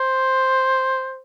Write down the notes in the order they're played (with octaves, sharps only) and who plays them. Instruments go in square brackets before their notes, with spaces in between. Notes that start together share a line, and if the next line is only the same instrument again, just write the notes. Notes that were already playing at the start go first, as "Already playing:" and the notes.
Already playing: [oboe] C5